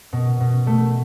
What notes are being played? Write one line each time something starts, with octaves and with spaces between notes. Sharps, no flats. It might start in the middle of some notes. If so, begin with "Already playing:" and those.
B2
B2
A3